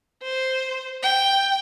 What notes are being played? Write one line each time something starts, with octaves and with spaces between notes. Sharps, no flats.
C5
G5